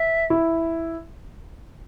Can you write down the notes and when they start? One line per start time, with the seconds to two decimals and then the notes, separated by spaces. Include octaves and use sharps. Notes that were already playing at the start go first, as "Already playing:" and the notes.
Already playing: E5
0.30 E4